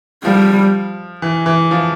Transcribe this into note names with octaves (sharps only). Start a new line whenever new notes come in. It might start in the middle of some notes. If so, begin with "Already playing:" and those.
F3 G3
E3
E3
F3